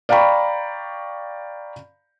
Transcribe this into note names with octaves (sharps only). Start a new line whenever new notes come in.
D5 F5 G5 A#5 B5 C#6